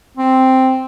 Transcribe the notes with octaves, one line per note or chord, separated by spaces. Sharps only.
C4